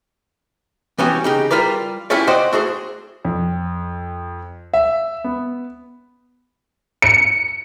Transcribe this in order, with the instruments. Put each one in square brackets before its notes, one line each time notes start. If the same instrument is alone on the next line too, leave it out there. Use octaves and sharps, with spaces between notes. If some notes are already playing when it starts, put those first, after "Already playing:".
[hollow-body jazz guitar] E3 G3 B3 C#4 F#4 G4
C#3 D#4 G4
G3 F4 A#4 B4 D5
C#4 E4 F4 G4 C#5 D5
F#4 C5 D5 D#5 F#5 G5
A3 F#4 G#4 C5
[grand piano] F2
E5
B3
[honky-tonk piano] C#7